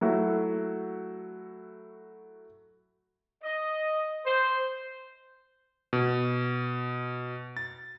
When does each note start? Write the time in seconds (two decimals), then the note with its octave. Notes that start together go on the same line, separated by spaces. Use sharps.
0.01 F#3 A3 E4 F#4
3.43 D#5
4.26 C5
5.93 B2
7.57 A6